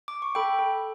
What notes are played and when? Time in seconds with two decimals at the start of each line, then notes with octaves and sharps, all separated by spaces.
0.08 D6
0.22 C#6
0.35 A4 G5 B5
0.59 A4